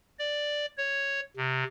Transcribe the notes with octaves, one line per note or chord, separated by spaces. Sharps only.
D5
C#5
C3